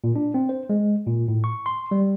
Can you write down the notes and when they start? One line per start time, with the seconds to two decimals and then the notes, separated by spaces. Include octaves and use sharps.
0.04 A#2
0.16 D4
0.34 C4
0.49 C5
0.70 G#3
1.07 A#2
1.28 A2
1.44 C#6
1.66 C6
1.91 G3